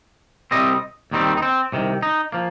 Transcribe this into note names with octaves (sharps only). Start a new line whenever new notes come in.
C2 C3 G3 C4 D#5
D#2 D#3 G3 C4
D#4
C4
C2 C3 D#3
D#4
F3 A#3